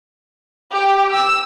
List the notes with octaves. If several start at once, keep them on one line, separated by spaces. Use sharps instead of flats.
G4 G5
E6